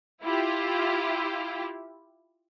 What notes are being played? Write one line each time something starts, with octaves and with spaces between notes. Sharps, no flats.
E4 F4 G4